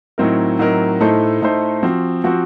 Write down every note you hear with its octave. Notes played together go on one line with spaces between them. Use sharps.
A2 F#3 C4 D#4 A#4
A2 F#3 C4 D#4 A#4
A2 A3 D#4 A4 C5
A2 A3 D#4 A4 C5
F3 C4 F#4
F3 C4 F#4